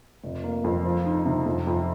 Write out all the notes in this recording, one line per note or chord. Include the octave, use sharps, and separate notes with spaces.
F1
A#3
F2
F3
D#4
C3
F2
F2